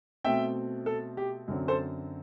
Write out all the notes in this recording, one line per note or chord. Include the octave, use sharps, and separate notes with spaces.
B2 A3 C4 E5 G5
A4
G4
F#2 D3 F#3 C4
A4 C5